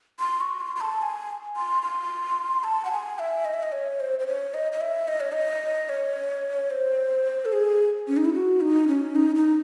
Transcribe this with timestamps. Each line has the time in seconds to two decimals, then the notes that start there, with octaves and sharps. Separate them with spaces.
0.20 C6
0.41 C#6
0.61 C6
0.76 C6
0.81 A5
1.02 G#5
1.56 C6
1.83 C6
2.64 A5
2.85 F#5
2.92 G#5
3.19 E5
3.45 D#5
3.54 E5
3.63 D#5
3.72 C#5
4.00 C5
4.19 C5
4.27 C#5
4.54 D#5
4.72 D#5
4.81 E5
5.08 D#5
5.20 C#5
5.32 D#5
5.89 C#5
6.71 C5
7.45 A4
7.53 G#4
8.08 C#4
8.17 D#4
8.25 E4
8.34 F#4
8.61 D#4
8.88 C#4
9.16 D#4
9.35 D#4